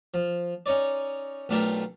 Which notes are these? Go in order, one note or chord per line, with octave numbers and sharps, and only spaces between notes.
F3
C#4 D#4 C#5 D5
B1 A3 D4 F4 G4 A#4